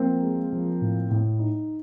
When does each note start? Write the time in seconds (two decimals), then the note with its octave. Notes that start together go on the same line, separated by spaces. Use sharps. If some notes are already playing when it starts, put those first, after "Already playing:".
Already playing: F3 A#3 C4
0.23 G#3
0.52 F3
0.81 A2
1.10 A2
1.39 D#4